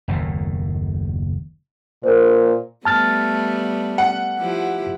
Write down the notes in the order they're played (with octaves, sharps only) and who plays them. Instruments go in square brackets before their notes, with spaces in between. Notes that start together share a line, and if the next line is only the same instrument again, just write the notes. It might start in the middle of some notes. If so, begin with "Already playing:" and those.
[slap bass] F#1 D#2 A2 D#3
[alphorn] A#2 [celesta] A#4 C5
[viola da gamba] G3 A3 B3 [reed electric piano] A5 F6 A6
[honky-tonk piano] F#5
[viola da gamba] F3 E4 G4